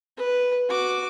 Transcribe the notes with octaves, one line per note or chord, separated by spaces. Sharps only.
B4
F#4 D6